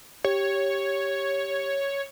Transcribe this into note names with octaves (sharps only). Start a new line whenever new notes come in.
G4 C#5